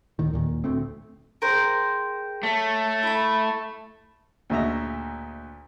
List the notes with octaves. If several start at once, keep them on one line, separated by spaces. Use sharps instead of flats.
D1 A2 D#3
D#2 A#2 D#3
D1 D2 A3 C4
G#4 A#4 C5 G5
A3 C#5
E4 A4 B5
D2 A#2 C#3 D#5 E5 A#5